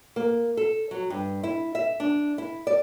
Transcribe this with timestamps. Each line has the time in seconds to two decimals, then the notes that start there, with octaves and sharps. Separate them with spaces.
0.16 A#3
0.57 A4
0.91 F#3
1.10 G2
1.43 E4
1.75 E5
2.00 D4
2.38 E4
2.67 D5